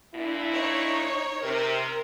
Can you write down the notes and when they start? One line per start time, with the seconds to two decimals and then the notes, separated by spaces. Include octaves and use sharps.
0.15 A#2 D4 E4
0.53 D#4 C#5
1.43 C3 A#4